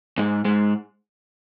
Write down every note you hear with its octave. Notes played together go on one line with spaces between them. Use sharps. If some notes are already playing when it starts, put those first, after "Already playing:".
G#2 G#3
G#2 G#3